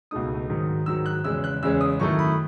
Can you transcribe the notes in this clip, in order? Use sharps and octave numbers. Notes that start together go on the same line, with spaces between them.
C#2 B2 A3 D#4 D#6
G#2 D#3 F#3
G#2 D#3 F#3 E6
F#6
E2 C#3 G#3 C#4 E6
F#6
E2 C#3 G#3 C#4 E6
D#6
F#2 D#3 A3 E4 C#6
B5